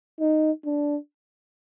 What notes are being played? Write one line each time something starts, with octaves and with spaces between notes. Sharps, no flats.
D#4
D4